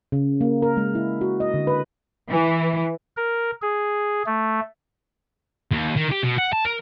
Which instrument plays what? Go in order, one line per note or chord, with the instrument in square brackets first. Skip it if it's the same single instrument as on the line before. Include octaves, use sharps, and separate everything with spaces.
[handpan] C#3
A#3
A#4
G#3
E4
F#4
D#5
D3
B4
[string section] E3
[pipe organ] A#4
G#4
A3
[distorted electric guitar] D#2
D#3
G4
B2
F#5
A5
A#4